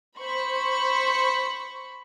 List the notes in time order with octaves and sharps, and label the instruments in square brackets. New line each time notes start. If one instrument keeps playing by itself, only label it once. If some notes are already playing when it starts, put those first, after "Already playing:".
[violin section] C5 B5 C#6